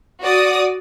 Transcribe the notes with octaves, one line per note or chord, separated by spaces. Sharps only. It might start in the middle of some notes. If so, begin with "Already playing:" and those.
F#4 D5 D#6